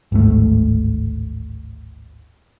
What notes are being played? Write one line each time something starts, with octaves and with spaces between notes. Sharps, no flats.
D1 G#1 G#2 A3